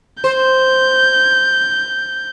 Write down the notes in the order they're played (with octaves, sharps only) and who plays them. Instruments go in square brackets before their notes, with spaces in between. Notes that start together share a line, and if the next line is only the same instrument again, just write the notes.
[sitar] C5 [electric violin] G6